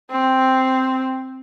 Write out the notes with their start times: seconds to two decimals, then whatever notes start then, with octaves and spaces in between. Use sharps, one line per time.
0.11 C4